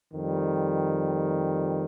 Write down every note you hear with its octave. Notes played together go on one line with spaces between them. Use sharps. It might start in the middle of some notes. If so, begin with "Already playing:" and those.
F2 D#3 G3